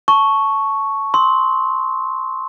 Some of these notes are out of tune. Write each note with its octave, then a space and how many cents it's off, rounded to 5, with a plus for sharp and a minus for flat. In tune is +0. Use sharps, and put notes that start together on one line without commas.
A5 +0 C#6 +0
C6 +0 E6 -35